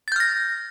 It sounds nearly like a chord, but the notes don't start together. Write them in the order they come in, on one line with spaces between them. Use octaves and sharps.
A6 G6 F6 A#6